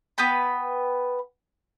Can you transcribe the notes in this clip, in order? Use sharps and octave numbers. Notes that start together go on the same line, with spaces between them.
B3 B4 G5 B5